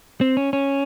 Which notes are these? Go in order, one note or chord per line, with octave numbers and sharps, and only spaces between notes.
C4
C#4
C#4